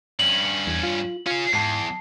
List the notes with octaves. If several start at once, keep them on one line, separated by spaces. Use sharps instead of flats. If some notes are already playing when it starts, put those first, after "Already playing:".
G2 C#4 F#7
E2
F4
C#4 F4 G#4
E2 G#2 A5 C7